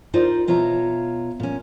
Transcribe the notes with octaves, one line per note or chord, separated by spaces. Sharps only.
D#4 F4 A#4 C5 D5
B2 F4 C#5 E5 A#5
A#2 C#4